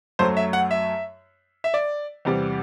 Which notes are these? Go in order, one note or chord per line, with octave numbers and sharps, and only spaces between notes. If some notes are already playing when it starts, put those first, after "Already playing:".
F#2 F#3 A3 C5
E5
F#5
E5
E5
D5
E2 C3 G3